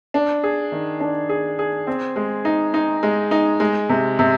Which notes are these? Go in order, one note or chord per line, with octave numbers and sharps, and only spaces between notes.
D4
G#4
D#3
D4
G#4
G#4
C4
G#3
D#4
D#4
G#3
D#4
G#3
C3
C3